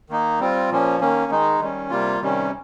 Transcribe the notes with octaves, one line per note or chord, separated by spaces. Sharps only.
D#3 A#3 D#4
G3 C4 F4
A#2 F3 A#3 C#4
D#3 A#3 C#4
D#3 G#3 D#4
D#3 G3 C#4
C3 G3 A#3 F4
C3 D#3 G3 C#4